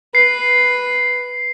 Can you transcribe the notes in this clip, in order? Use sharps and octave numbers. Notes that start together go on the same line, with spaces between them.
B4 C7